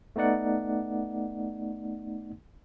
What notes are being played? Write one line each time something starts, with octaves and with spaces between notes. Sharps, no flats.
A3 B3 D#4 D5 F#5